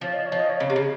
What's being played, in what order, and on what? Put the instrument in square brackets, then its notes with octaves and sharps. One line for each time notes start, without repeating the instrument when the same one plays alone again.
[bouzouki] F3 [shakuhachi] C#5
[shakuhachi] D#5
C#5
[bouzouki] F3
[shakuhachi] D#5
C#5
[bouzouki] C#3
C3
C#3